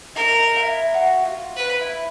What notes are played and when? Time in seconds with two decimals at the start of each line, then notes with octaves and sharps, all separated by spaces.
0.15 D#4 A#4
0.39 D#4
0.56 F4
0.63 E4
0.94 F#4
1.25 F4
1.57 B4
1.81 E4